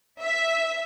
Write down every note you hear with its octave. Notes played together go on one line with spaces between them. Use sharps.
E5